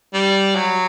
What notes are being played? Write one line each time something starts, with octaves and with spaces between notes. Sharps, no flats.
G3
F#3